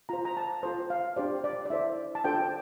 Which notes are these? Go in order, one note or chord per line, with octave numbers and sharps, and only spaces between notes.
F4 C5 A#5
A#5
A5
F4 A4 C5
F5
D4 G4 C5 D5
D5
D5
E4 A4 C5 E5
A5
D4 F4 A4 C5 G5